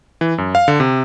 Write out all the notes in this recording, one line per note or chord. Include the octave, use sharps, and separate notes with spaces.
E3
F#2
F5
D3
C3